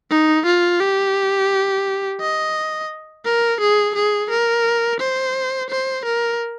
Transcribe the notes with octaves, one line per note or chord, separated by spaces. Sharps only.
D#4
F4
G4
D#5
A#4
G#4
G#4
A#4
C5
C5
A#4